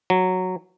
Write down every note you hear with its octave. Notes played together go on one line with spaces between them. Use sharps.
F#3